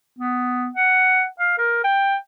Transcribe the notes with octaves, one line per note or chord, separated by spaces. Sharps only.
B3
F#5
F5
A#4
G5